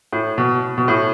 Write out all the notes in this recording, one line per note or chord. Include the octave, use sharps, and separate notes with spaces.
A2
B2
B2
A2